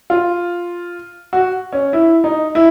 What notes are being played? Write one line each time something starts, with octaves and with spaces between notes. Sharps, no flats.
F4
F#4
C#4
E4
D#4
E4